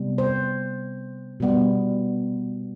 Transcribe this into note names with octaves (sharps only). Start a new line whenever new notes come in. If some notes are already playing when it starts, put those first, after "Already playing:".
Already playing: C3 G3 B3
C5
B2 G3 B3